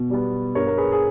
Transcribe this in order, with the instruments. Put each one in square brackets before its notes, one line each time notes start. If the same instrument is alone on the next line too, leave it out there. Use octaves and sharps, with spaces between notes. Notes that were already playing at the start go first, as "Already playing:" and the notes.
Already playing: [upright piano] B2
G3 B3
G2 A#4 C#5
A#4
G#4 B4
G#4